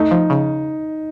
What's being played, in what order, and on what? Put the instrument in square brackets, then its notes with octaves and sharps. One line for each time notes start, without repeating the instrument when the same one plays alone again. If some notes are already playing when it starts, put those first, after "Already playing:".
Already playing: [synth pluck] A3 [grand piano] D#4
[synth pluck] F3
C#3